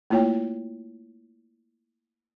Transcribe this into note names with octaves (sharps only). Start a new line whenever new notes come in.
A3 A#3 E4 F4 C#5 G5